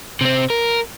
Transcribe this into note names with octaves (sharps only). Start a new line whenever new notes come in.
C3 C4
A#4